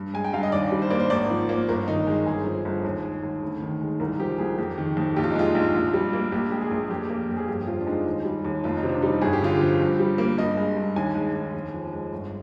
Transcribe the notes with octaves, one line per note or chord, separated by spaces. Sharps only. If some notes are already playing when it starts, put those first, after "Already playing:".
Already playing: G2
G#3 G#5
G5
G2 F5
D#5
D#2 D5
G3
C5
A#3 D5
C5
G#1 D5
F3
A#3
G1 A#4
D#3 D#4
G#3
G1 G#4
F3
G1
D#2
G#3
D#2
D2
D#3
G#3
C2 A#4
F3 G4
C2 G#4
F2 G4
D#3
F2
A#1 G4
F4
D#4
G#3 F4
A#1
A#1
G3
A#3
A#1 G4
G#3 G4
G#4
A#1
F2 G4
A#3
F2
G#4
G1 G4
F3 F4
D4
G#3 D#4
D#2
G3
D#2
F1 F4
D#4
C3
D4
G3 D#4
G1 G#4
G4
D3 F4
F3 G4
G2
G3
A#3
G2 D#5
G#3
G2
D#2 G#5
G#3
D#2
F2
F3
G#3
G1